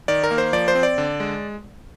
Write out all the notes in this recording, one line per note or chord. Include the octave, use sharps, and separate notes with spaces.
D#3 D5
A#4
A#3
C5
F3 D5
C5
C4
D5
D3
G#3